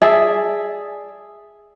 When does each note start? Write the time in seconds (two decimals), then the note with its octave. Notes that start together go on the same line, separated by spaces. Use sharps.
0.02 G#4 D5 E5 A5